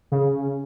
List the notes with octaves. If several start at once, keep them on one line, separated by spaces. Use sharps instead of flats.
C#3